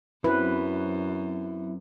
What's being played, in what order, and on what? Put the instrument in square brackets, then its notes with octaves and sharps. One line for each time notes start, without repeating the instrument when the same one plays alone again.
[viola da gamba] F#2 [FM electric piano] F#3 C4 [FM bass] E4 [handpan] B4